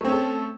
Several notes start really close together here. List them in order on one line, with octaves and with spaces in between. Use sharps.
A3 C4 C#4 A4